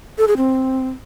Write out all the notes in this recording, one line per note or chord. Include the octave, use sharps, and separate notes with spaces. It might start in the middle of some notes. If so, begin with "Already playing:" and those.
A4
G#4
C4